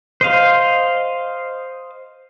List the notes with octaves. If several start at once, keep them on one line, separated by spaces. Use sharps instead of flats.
C5 D#5 F5